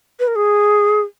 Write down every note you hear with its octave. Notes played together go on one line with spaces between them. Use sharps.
B4
A#4
G#4